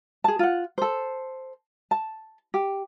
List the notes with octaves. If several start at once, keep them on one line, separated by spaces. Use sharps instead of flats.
G#4 A5
F4 F#5
A4 C5
A5
G4